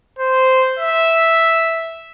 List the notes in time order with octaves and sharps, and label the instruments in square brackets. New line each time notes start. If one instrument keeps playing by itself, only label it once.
[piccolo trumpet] C5
E5